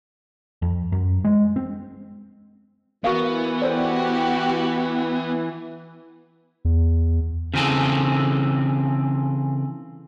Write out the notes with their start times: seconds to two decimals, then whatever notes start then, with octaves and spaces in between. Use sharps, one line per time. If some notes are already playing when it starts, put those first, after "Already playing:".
0.62 F2
0.92 F#2
1.24 G#3
1.56 C4
3.04 E3 B3 F#4 A#4 F5
3.62 F#4 G4 A4 C5 D5
6.65 E2
7.54 C#3 E3 C4 G#4 A4